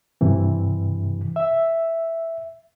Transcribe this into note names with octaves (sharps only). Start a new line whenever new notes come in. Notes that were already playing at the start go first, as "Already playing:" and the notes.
G2 C3 E3
E5